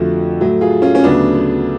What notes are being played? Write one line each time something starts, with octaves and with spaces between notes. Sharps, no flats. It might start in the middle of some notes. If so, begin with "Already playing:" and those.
Already playing: F2 D3 F3 A3 F#4 A4
A2 F#3 A3
F4 G#4
C#4 F4
C#4
D2 C#3 F#3 A3 B3 D4
B3